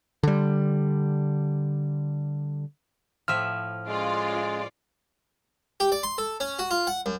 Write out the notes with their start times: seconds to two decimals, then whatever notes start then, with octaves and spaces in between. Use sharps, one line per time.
0.23 D3 G3
3.28 A2 F3 E5 F6
3.88 G#3 C#4 F4 D5
5.80 G4
5.92 D5
6.03 C6
6.18 A4
6.40 C#4
6.59 F#4
6.71 F4
6.87 F#5
7.06 F#2